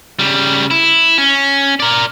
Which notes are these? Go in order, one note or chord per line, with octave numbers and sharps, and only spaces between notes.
C#3 G3
E4
C#4
A#4 D5